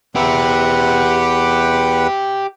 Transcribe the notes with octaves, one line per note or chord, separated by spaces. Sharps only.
E2 G4 B4 E5 F#5